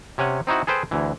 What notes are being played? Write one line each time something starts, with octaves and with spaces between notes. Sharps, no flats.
C3 C#4 C#5 F#5 G#5
C4 D#4 E4 F#4
G#4 A4 B4 C5 G5
D2 E3